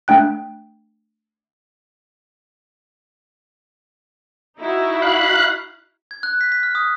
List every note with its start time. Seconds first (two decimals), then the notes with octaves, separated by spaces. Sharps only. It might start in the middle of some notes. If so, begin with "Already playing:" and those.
0.08 A3 D4 G5 F#6
4.59 D#4 E4 F#4
5.02 F5 B5 F#6
6.11 G#6
6.23 F#6
6.41 B6
6.52 B6
6.63 F6
6.75 D#6